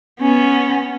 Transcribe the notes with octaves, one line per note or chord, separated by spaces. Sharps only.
B3 C#4